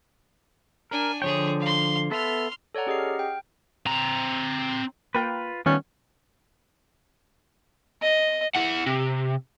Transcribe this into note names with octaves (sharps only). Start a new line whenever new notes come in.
D4 A#4 G#5
D3 F3 G#4 C#5 G5
F5 C6
B3 A4 E5 C6 F6
A4 C#5 D5 F#5 A#5
C#4 G4 G#4 D#5 F#5 C7
F6
G5
C4 A#5
A#3 F4 A#4 B4 G5
D#3 G3 A3 B3 C#4 F4
D#5
E4 F#5
C3